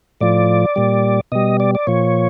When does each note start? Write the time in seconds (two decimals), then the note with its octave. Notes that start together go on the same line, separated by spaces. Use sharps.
0.21 A2 F3 D5
0.76 A#2 G3
1.32 B2 G3 D#5
1.60 D5
1.75 D5
1.87 A#2 F3 C#5